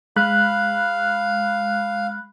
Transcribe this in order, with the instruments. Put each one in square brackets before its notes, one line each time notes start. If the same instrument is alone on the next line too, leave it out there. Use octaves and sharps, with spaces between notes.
[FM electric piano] G#3 B5 F#6 [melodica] F5